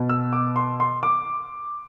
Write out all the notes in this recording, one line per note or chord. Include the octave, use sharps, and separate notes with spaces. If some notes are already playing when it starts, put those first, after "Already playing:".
Already playing: B2
E6
D6
C6
C6
D6